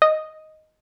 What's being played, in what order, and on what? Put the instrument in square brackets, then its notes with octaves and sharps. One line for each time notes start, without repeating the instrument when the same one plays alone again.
[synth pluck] D#5